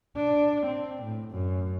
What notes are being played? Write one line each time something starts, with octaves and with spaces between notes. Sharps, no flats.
D4
C4
A2
F#2